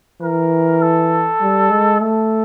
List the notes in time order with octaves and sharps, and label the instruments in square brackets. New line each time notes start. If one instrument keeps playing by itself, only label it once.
[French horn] E3 [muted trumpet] A#4
[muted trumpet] A4
[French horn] G3
G#3
[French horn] A3 [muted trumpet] A4